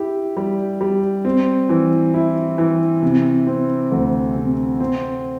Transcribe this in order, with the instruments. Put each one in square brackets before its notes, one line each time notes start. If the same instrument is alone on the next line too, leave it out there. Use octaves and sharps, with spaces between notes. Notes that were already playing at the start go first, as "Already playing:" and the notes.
Already playing: [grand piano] E4 G4
G3
G3
C4
E3
E4
E3
C3
C4
D2
C3
C4